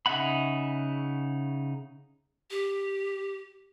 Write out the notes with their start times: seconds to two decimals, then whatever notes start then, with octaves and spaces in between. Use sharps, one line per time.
0.06 C#3 D#4 E5 F#5 B5
2.51 G4